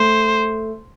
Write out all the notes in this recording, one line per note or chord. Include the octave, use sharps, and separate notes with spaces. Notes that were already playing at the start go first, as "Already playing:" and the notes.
Already playing: A3 C5